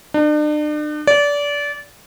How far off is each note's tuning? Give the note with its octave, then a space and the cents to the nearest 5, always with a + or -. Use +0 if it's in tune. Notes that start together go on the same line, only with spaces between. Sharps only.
D4 +40
D5 -25